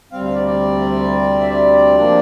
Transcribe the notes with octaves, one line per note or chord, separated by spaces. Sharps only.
D2 C3 G3 C4 F5
F5
D5
D5
E5
D5
C3 F3 A#3 D4